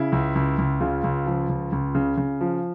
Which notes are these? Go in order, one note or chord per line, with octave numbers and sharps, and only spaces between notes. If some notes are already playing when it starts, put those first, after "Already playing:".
Already playing: C#3 E4
C#2
C#2
C#2
C#3 F4
C#2
F3
C#2
C#2
C#3
C#3
F3